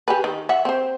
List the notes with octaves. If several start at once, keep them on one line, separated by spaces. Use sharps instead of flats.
G4 G#4 B4
D#3
E5 F#5
C4 C5